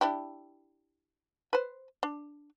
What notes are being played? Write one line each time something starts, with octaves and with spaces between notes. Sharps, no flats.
D4 E4 G4
B4 C5
D4